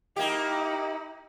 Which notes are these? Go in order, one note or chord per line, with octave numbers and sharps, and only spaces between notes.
A#3 D#4 E4 G4